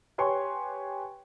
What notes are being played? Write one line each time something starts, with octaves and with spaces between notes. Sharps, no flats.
G4 B4 C#5 G#5 C6 C#6